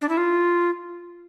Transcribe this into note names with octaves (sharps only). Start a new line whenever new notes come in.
D4
E4
F4